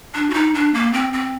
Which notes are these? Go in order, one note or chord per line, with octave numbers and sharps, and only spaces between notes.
D4
F#4
D#4
D4
A#3
C4
C4